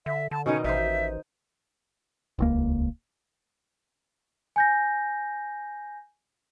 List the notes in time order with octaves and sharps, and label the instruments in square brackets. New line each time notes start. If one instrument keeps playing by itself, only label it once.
[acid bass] D3 [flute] E5
[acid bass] D3 [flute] A5
[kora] B2 D#3 D#4 [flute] C#4
[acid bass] A1 [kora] D#4 C5 [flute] E5
[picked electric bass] D#1 C#2 A#3
[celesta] G#5 G6 A#6